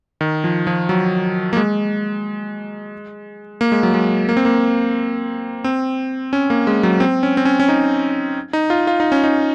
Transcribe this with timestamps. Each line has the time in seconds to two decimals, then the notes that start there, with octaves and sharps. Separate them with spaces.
0.21 D#3
0.44 F3
0.67 F3
0.89 F#3
1.53 A#3
1.57 G#3
3.61 A#3
3.72 G#3
3.83 F#3
3.94 G#3
4.29 A#3
4.37 C4
4.45 A#3
5.64 C4
6.33 C#4
6.50 A#3
6.67 G#3
6.83 F#3
7.00 C4
7.23 C#4
7.37 C4
7.45 C#4
7.60 C#4
7.69 D#4
8.53 D#4
8.70 F4
8.87 F4
9.00 D#4
9.12 C#4
9.24 D#4